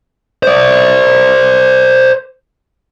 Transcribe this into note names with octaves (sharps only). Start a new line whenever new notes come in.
C5 D5